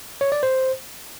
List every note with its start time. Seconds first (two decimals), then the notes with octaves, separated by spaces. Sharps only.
0.21 C#5
0.32 D5
0.43 C5